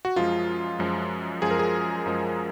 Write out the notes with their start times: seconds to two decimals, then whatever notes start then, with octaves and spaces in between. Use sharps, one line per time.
0.05 F#4
0.16 F#2 F3 G#3 F4
0.79 F#2 F3 G#3
1.42 F#2 F3 G#3 G#4
1.51 A#4
1.59 G#4
2.06 F#2 F3 G#3